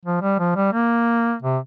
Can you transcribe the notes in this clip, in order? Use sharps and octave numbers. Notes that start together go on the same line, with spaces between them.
F3
G3
F3
G3
A#3
C3